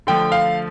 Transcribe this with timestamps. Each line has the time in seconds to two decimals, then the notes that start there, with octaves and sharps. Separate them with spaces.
0.07 D3 F3 A3 G5
0.32 F5